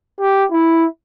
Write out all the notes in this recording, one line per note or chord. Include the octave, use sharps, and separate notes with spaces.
G4
E4